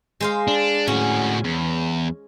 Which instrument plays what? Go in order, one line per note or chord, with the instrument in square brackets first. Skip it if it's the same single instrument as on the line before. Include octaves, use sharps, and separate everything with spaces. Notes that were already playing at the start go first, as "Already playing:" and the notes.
[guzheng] G#3 C5 F5
[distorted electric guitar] D4
[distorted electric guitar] A2 F#4 [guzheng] C#4
[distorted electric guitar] E2